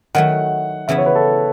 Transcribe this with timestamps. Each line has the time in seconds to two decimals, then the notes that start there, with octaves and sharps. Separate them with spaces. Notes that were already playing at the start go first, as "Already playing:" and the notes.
0.15 D#3 F#3 A3 F#5
0.88 C#3 E3 B3 E4 E5
0.98 C#5
1.06 B4
1.15 A4